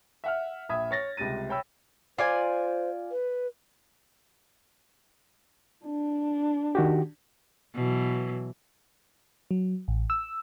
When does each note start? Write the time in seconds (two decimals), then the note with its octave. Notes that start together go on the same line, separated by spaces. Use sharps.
0.24 E5 F#5 F6
0.69 A#1 E5 B5 D#6 G#6
0.91 C#5 A6 A#6
1.17 C#2 C3 G3 A6 D#7
1.49 C#5 G5 B5 E6
2.18 F4 C5 D5 G#5
3.11 B4
5.85 D4
6.75 D#3 F#4 G4
7.75 B2 E3 F#3
9.51 F#3
9.88 A1
10.10 E6